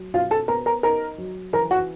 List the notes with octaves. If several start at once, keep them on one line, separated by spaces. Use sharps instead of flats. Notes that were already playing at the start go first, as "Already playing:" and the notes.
Already playing: F#3
B2 F4 F5
A4 A5
B3 A#4 A#5
A#4 A#5
D#4 A#4 A#5
F#3
E3 A#4 A#5
F#4 F#5